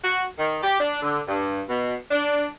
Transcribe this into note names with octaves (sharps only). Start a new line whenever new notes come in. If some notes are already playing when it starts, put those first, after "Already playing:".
F#4
D#3
G4
D4
D3
G2
B2
D4